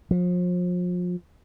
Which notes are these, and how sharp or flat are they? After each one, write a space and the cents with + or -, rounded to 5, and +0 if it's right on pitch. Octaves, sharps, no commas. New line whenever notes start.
F3 +35